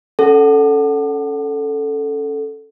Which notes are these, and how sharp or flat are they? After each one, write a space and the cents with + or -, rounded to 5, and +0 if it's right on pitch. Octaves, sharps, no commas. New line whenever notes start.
C#4 +0 A4 -5 F#5 +0